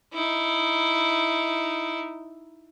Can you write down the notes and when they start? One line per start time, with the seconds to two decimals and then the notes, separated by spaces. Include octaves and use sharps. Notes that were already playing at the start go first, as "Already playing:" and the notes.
0.13 D#4 E4